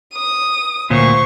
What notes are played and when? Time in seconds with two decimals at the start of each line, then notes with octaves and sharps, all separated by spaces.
0.15 D#6
0.90 D2 A#2 C5 C#6